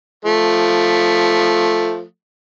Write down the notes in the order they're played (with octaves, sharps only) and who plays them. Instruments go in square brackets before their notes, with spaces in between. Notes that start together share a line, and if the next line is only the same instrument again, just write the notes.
[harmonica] F3 A3